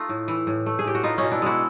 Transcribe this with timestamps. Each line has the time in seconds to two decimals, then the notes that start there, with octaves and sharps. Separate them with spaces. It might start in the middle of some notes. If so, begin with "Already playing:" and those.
Already playing: A3 D#4 F4
0.09 A2
0.28 E3
0.47 A2
0.66 A3
0.79 G#4
0.84 A2 G4
0.95 F#4
1.03 B3 D#4 F4
1.18 B2 C#4 D#4
1.32 D4 E4
1.42 G#3 E4 F#4